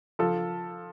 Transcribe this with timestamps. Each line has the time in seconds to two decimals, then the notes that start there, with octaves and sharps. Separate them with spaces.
0.19 F3 A4